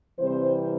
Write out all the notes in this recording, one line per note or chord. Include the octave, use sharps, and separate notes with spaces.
C3 E3 G3 C4 C5